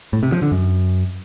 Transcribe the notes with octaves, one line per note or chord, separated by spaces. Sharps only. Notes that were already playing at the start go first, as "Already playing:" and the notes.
A2
C3
F3
D3
F#2